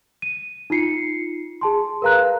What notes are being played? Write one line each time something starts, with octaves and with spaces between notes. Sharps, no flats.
D#7
D#4 F4 C7 C#7
G#4 A5 C6
A#4 B4 F5 A#5 F#6